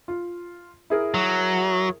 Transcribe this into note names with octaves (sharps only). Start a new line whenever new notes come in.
F4
E4 G#4 A#4
F#3